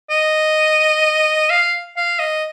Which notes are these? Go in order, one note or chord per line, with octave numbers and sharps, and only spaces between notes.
D#5
F5
F5
D#5